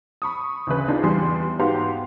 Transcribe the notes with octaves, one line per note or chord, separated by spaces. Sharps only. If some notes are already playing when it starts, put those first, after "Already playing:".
B5 C#6 D#6
D2 C#3 B4
D4 D#4 F4 G#4
E2 G3 C6
G#2 B3 F#4 G4 F5 C6